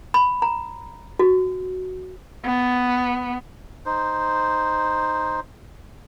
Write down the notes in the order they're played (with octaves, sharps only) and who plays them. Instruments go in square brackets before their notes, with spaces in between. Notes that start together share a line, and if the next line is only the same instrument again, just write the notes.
[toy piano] B5
A#5
F#4
[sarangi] B3
[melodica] D#4 C5